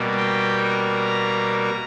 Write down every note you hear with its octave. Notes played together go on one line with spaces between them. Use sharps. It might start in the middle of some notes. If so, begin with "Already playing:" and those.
Already playing: B2 G3 A#3
G5
A#5